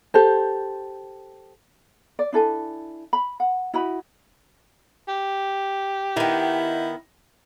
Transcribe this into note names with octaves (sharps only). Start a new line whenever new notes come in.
G4 A4 C5
D5
D4 E4 A4 G#5
B5
F#5
E4 F#4 D#5 B5
G4
D#3 B3 E4